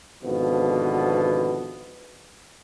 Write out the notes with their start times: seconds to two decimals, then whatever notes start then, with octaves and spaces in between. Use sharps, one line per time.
0.23 G#1 B2 D3 F3 B3